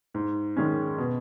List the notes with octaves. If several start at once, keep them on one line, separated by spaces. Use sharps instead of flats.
G#2
D#3 G#3 C#4
B2